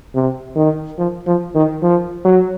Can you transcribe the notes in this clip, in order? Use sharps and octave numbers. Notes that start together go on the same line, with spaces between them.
C3
D#3
F3
F3
D#3
F3
F#3